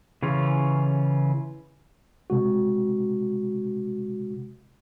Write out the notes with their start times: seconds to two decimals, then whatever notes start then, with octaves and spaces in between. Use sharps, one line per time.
0.22 C#3 E3 C#4 F4
2.30 C3 G#3 F#4